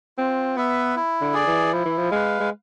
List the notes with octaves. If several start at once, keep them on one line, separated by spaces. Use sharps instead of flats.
C4 F4
B3 B4 E5
E4
D3
G#4 D5
E3
F3 E4
E3
F3
G#3 B4 F5
G#3